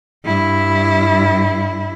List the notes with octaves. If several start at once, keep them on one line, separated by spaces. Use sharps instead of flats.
G2 E4